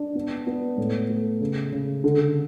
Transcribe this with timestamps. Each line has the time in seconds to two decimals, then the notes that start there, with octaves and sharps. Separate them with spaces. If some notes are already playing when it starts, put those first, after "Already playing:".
Already playing: D4
0.15 B3
0.47 B3
0.78 A2
1.10 A3
1.40 C#3
1.72 C#3
2.04 D3